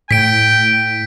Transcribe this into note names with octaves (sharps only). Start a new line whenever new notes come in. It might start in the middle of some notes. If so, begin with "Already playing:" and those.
A2 G5 B6 D7